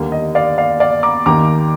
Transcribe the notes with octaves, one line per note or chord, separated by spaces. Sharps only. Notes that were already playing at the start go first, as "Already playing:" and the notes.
Already playing: D#2 D3 G3 A#3
D#5
D5 F5
D5 F5
D5 F5
A#5 D6
D#2 D#3 A#3 A#5 D6